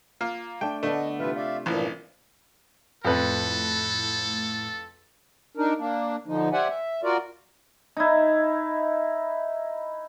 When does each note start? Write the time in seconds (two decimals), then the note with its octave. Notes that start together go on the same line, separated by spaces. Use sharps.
0.21 A#3 F4 F6
0.61 A3 D4 G5
0.83 D3 A3 B3 D4 D#5
1.20 C3 E3 F4 B4 E5
1.36 D5 E5 F5
1.66 A1 G2 A#2 E3 F3
3.05 F2 A2 A4 B4
5.57 D4 D#4 A#4
5.78 A#3 D4
6.27 D3 F3 D#4
6.53 G4 C5 D5 E5 F#5 G#5
6.69 E5
7.03 F4 F#4 A#4 D5
7.97 D#4 E4